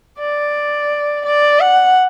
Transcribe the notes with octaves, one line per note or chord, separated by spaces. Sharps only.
D5
D5
F#5